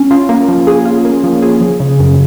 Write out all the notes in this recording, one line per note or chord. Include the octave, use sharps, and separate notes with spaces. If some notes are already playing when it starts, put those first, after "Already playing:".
Already playing: C#4
F4
A#3
F3
G#4
F4
A#3
F3
G#4
F3
C#3
F#2